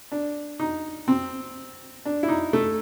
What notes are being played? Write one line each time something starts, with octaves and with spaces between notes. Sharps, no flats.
D4
D#4
C4
D4
E4
D#4
A3